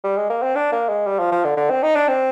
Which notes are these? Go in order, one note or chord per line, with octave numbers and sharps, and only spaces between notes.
G3
G#3
A#3
C4
D4
A#3
G#3
G3
F3
F3
D3
D3
C4
D#4
D4
C4